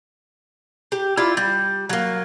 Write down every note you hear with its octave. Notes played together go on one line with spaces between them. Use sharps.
G4
E4 F4 D5
G3
F#3 A#3